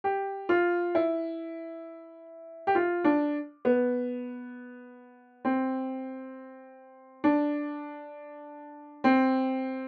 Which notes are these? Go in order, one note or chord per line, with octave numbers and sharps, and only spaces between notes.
G4
F4
E4
G4
F4
D4
B3
C4
D4
C4